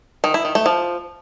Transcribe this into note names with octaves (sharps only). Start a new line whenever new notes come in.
D#3
E4
D#3
A3
F3